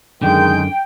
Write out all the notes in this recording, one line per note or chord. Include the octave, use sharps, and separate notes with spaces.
F#2 D3 D#3 G#3 G5 G6